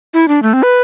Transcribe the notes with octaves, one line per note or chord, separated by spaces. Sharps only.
E4
D4
A3
C4
B4